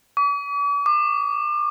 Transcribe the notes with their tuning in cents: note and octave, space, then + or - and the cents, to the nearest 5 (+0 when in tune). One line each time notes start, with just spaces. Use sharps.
D6 -45
D6 +35